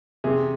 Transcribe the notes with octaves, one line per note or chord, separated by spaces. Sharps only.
C3 G#4